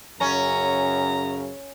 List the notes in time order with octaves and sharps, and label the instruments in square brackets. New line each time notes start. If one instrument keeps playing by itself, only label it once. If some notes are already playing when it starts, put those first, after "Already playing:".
[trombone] F#2 [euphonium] C#3 [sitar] C#4 [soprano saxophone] A#5